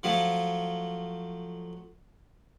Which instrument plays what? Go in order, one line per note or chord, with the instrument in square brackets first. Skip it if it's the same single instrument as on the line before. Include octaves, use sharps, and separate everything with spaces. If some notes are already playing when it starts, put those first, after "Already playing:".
[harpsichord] F3 F#3 A3